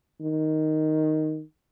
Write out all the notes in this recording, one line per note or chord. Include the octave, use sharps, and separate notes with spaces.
D#3